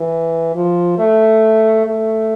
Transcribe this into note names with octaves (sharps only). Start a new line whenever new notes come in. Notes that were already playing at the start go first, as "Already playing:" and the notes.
Already playing: E3
F3
A3
A3